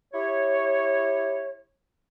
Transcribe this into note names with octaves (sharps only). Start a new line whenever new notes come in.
E4 G4 C#5